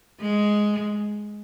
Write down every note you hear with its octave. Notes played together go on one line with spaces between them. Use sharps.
G#3